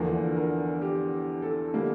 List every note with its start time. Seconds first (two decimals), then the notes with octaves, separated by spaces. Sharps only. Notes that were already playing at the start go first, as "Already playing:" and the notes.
Already playing: E2 D3 F3 A#3 A#4
0.36 A#4
0.82 G4
1.42 A4
1.74 D3 G3 A#3